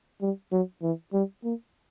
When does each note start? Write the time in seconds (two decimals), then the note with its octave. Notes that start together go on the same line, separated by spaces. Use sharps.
0.21 G3
0.52 F#3
0.82 E3
1.13 G3
1.44 A#3